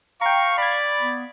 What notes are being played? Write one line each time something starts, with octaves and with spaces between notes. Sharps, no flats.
F5 G5 A#5 C#6
D5 B5 G#6
B3